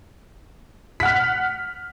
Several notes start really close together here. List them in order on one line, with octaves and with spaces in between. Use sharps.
B6 F#5 F6